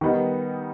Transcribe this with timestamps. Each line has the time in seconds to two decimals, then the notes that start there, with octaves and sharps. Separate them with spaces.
0.01 D#3 G3 B3 D#4